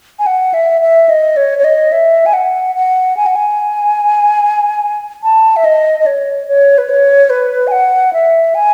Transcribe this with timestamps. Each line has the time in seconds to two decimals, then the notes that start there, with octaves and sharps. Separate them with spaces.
0.19 G#5
0.26 F#5
0.54 E5
0.81 E5
1.09 D#5
1.37 C#5
1.58 C#5
1.64 D#5
1.92 E5
2.26 G#5
2.33 F#5
2.75 F#5
3.17 G#5
3.26 F#5
3.36 G#5
5.23 A5
5.56 E5
5.65 D#5
6.00 D#5
6.06 C#5
6.48 C#5
6.78 B4
6.90 C#5
7.30 B4
7.67 G#5
7.72 F#5
8.13 E5
8.55 G#5